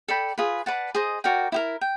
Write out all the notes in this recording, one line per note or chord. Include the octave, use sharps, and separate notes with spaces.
A4 D5 G5 B5
F4 G#4 B4
B4 D5 F#5 A5
G#4 C5 D#5
F#4 A#4 D5 G5
E4 G4 A#4
G5